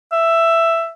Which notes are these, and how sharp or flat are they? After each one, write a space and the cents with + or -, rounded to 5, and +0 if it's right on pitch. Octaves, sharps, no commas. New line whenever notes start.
E5 +10